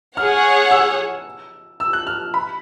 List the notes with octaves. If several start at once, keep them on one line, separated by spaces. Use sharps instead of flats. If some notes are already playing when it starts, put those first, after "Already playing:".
G#4 C#5 F#5 F6
E6
E6
F#6
F6
B5